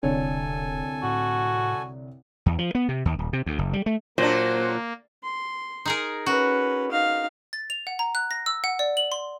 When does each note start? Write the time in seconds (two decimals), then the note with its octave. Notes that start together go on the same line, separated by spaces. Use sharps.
0.03 E1 C2 D3 A4 C#5 G#5
1.03 A2 F#4
2.46 E2
2.58 F3
2.75 B3
2.89 C3
3.05 D#2
3.19 D#1
3.33 C3
3.46 D2
3.59 F#1
3.73 G3
3.86 A3
4.18 A#2 F#3 A#3 D4 C5
5.23 C6
5.85 D#4 G#4 A#4
6.26 C#4 F#4 B4
6.91 D#4 F5
7.53 A6
7.70 F7
7.87 F#5
7.99 A#5
8.15 F#6
8.31 A#6
8.46 E6
8.64 F#5
8.79 D5
8.97 F#7
9.12 C6